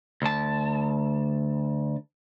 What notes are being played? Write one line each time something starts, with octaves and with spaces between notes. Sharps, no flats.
D2 A5